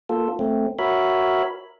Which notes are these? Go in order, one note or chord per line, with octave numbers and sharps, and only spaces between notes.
A#3 F4 A4
A3 C4
F#4 A#4 C#5 E5 B5